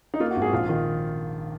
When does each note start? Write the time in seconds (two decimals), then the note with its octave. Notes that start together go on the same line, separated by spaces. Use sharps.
0.14 D#4
0.20 A#3 F4
0.31 F#4
0.36 G#1
0.42 G#4
0.53 A#1 F4
0.69 D#3